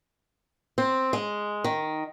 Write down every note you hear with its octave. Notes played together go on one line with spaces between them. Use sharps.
C4
G#3
D#3